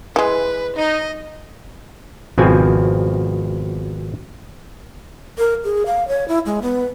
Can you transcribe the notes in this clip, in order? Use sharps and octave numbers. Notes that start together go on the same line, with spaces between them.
E3 G#3 B4
D#4 D#5
G#1 B2 F3 C4 G#5
A#4
G#4
F5
C#5
E4
G#3
B3